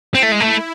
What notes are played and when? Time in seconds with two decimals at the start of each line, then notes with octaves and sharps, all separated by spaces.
0.14 C4 E4
0.23 A3
0.32 G#3
0.40 A3